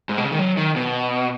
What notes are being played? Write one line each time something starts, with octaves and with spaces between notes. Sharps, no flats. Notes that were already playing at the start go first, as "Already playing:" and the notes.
G#2
B2
C#3
D#3
F#3
D#3
B2